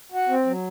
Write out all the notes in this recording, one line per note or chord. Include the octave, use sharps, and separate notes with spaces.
F#4
C4
F#3